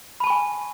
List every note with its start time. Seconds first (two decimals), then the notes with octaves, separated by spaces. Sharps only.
0.20 B5
0.24 A5
0.27 C#6
0.30 G#5